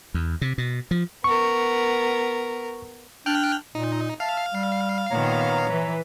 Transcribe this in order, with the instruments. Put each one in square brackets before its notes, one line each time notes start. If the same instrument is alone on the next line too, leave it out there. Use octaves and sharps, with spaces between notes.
[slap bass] E2
C3
B2
F3
[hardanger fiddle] B3 A#4 [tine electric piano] C#6
[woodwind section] D4 [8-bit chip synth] G5 F6 F#6
[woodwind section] A#2 [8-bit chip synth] D#4
[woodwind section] E5 A5 F6 [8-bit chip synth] F5
[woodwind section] G3
[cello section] A#2 D#3 B3 [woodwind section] C#5 A#5
[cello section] E3 B4